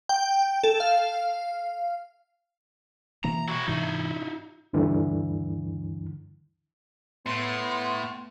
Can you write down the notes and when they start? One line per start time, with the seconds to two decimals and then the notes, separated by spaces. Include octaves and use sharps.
0.09 G5
0.64 A4
0.80 F5
3.24 B2 E3 A#3 A#5
3.48 E4 F#4
3.68 G#2 C3 E3 D#4 E4
4.73 D2 G2 D3 E3
7.26 A2 B3 C6